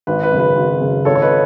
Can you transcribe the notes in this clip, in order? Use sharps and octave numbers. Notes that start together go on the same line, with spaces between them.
G#1 B4
B4
F#2 C#3
B4
G#1
F#2 C#3
G#1 A4 C#5
C#5
B4 D#5